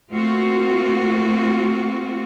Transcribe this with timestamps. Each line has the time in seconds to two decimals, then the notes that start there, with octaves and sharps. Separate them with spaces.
0.12 A3 A#3 C4 F4 F#4